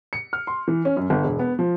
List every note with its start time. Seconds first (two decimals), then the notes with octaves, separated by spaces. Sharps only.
0.13 C#7
0.33 F6
0.47 C6
0.68 E3
0.85 C#4
0.97 F#2
1.10 G1
1.24 E1
1.39 B3
1.59 F3